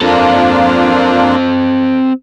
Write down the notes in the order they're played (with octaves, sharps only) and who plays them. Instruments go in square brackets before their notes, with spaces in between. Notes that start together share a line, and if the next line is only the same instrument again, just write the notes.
[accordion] A#3 D4 F4 [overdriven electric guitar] C4 A4